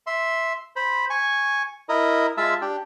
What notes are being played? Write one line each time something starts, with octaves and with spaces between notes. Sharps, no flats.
E5 C6
C5 B5
G#5 C#6
E4 A#4 D#5
G#3 F4 E5 A5 E6
D4 G4